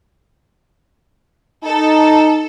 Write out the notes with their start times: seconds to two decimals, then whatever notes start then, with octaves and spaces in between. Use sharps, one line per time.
1.64 D#4 A4